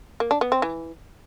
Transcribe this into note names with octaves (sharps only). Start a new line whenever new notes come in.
A#3
D4
B3
C4
E3